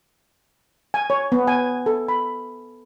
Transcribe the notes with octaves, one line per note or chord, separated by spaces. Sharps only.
G#5
C#5
B3
G#5
A4
B5